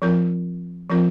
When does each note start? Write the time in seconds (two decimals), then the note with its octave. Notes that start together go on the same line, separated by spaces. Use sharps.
0.02 F3 C4 F4 A#4
0.90 F3 C4 F4 A#4